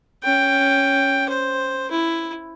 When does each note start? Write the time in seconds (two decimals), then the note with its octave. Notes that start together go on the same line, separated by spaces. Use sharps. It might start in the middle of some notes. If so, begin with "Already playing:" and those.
0.23 C#4 G5
1.30 C5
1.91 E4